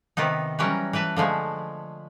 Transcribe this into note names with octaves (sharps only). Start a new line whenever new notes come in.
C3 D#3 B3 D#4
E3 F#3 G3 C#4 A#4
E3 E4 B4 A5
D3 F3 G#3 A3